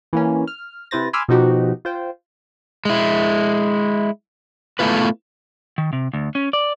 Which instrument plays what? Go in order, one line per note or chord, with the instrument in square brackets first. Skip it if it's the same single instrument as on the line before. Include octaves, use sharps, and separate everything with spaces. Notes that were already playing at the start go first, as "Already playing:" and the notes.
[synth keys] E3 A#3 C#4
F6
C3 E4 B4 C5 A6 A#6
G#5 B5 C6 D6 E6 F6
B2 F3 D#4 F#4 G4
F4 C5 G5
[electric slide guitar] G#3 E4
A3 B3 E4 F4 B4
[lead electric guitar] D#3
C3
D2
C#4
D5